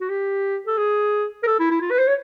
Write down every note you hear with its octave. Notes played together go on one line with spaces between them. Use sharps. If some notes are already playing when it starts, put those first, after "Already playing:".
F#4
G4
A4
G#4
A#4
A4
E4
E4
F4
B4
C5
C#5